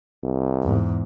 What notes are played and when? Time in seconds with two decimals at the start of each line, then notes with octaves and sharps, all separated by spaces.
0.24 C2
0.63 E2 G#2